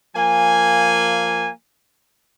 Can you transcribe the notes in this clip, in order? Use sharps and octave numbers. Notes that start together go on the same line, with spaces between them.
F3 A#3 G#5